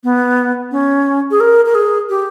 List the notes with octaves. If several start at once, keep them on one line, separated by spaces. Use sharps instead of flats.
B3
C#4
G#4
A#4
A#4
G#4
G4